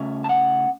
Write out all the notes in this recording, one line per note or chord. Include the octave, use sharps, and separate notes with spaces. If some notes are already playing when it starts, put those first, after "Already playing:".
Already playing: C#3 A3 C#4
A5
F#5